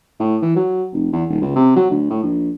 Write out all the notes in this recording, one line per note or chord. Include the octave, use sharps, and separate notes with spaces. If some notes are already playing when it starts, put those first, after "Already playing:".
A2
E3
F#3
F1
E2
D#1
C#2
C3
F#3
D2
A2
A#1